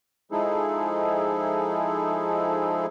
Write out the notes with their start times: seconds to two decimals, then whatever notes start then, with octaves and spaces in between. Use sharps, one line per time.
0.31 F3 G#3 D#4 E4 G#4 A4